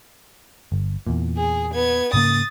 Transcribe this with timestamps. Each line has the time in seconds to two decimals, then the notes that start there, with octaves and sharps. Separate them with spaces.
0.72 G1
1.07 E2 A#2
1.37 G#4
1.74 B3 G#6
2.13 G#2 C#3 A#3 D#6 A6